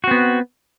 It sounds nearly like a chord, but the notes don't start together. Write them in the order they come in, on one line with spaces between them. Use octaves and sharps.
F#4 C4 B3